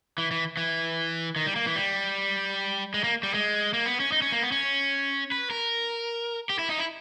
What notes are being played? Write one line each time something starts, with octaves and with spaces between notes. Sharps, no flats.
E3
E3
E3
D#3
G3
A#3
E3
G3
G#3
A#3
G3
G#3
A#3
B3
C#4
D#4
C#4
A#3
B3
C#4
B4
A#4
G4
E4
D#4
E4